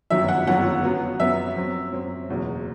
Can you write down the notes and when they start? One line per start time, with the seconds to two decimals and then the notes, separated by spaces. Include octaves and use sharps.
0.10 G1 F#2 D#3 F#3 E5
0.28 F#5
0.47 G1 F#2 D#3 F#3 F#5
0.83 F#2 F#3 B3
1.20 F#2 F#3 B3 E5
1.56 F#2 F#3 C4
1.92 F#2 F#3 C4
2.29 F#1 E2 B2 F#3